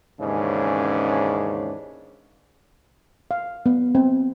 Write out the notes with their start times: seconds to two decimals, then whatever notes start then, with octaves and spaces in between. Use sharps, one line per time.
0.21 D#2 G#2 C#3 E3 C#4 D4
3.31 F5
3.66 B3
3.95 C4